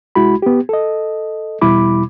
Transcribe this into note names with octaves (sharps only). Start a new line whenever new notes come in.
C2 G#3 E4 F#4 B5
B3 G4
A4 D#5
E2 B2 G3 E4 B5 D6